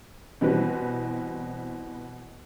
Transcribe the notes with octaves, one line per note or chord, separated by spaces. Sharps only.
B2 E3 G3 C4 B4